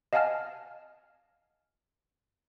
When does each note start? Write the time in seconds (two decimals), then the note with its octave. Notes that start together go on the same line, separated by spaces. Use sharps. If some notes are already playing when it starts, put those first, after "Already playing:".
0.13 D#5 F5 F#5 G#5 A5 F6